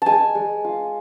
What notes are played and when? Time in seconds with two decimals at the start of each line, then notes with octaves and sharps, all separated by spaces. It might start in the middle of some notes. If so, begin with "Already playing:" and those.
0.02 G#3 G#5 A5
0.35 G#3
0.64 F4